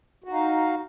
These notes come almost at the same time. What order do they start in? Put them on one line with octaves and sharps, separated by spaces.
F#4 D#4 F5